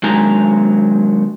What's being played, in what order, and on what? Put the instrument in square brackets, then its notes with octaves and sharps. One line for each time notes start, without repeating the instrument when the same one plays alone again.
[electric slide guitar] D#3 F#3 G#3 D4 G#5 A#5